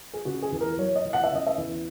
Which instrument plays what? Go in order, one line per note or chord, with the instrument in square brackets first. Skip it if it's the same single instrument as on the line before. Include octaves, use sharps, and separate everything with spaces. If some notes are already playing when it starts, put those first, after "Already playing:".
[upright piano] G#4
C#3 F#4
G#4
E2
A#4
F#3 C#5
D#5
E2
F#5
E5
C#3 D#5
E5
E2